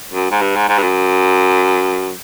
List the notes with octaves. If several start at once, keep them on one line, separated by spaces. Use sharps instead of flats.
F#2
G#2
G2
G#2
G#2
G2
F#2